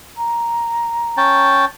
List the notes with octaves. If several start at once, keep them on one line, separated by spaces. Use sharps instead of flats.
A#5
C#4 G5 A5